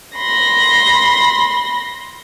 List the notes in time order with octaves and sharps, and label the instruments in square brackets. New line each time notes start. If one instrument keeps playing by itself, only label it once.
[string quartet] B5 C6 A#6